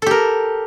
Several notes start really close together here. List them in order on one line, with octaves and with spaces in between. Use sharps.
A4 G4 A#4